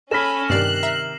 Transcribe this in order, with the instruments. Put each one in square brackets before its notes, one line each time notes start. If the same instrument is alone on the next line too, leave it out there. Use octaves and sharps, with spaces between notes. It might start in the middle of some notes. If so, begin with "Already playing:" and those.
[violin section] C#4 B5 [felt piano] A4 B6 [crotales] F6 A#6 E7
[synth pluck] G2 D5 [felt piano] C3 D#3 [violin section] F#6 [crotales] A#6 C7 F#7
[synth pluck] E5 A#5